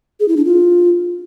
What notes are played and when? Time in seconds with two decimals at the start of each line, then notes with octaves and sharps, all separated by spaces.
0.20 G#4
0.28 E4
0.37 D4
0.45 F4